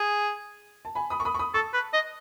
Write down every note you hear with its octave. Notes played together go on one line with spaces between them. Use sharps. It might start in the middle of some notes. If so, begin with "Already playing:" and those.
Already playing: G#4
A5
G#5 B5
B5 D#6
C#6
B5 D#6
C#6
B5 D#6
A4 A5 C#6
B4
D#5